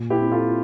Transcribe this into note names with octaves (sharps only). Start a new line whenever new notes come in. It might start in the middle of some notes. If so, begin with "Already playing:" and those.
Already playing: A#2
E4 G4
C4
F4 A4